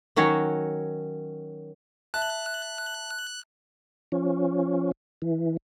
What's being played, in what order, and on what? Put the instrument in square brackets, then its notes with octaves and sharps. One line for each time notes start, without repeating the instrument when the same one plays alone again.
[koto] D#3 F#3 C#4 F#4 C#5
[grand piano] E5 A5 [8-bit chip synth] F#6
[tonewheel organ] F3 C#4
E3